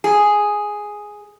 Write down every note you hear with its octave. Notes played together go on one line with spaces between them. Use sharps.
G#4